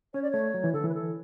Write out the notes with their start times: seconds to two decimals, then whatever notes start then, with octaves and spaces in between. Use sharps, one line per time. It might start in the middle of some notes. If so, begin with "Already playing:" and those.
0.14 C#4 C#5
0.22 D5
0.31 A3 C#5
0.54 F#3
0.64 E3
0.74 D3 A4
0.84 E3 B4
0.94 A4